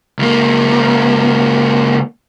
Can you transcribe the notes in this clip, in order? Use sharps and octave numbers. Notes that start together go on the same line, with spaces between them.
C#2 A#3